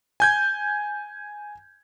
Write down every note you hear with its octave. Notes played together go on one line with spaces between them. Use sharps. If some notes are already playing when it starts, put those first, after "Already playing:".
G#5 G6 G#6